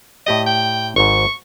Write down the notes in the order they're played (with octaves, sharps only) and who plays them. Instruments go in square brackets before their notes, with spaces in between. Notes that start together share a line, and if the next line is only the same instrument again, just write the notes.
[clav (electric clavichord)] A2 G4 D5 [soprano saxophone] D#5
[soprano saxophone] G5
[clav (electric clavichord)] G#1 G#2 [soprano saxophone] C#6